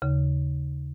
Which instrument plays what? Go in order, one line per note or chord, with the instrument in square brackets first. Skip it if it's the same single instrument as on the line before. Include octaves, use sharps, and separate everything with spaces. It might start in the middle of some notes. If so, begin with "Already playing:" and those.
[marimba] D#2 C#3